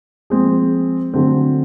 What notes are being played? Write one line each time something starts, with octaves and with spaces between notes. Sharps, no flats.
F3 G#3 C4 F4 G#4
D3 F#3 A3 C4